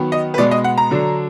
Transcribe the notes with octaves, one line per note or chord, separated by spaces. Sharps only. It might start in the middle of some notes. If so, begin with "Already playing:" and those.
Already playing: D#3 F#3 B3
D#5
B4
B2 G#3 B3 D5
D#5
F#5
A#5
D3 F#3 D4